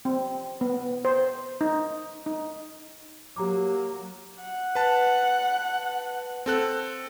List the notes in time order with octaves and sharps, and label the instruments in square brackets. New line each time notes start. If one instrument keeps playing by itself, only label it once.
[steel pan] C4
B3
C5
D#4
D#4
[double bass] F#3 A#3 [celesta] G4 A#5 D6
[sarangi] F#5
[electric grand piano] B4 A5
C4 A4 F#6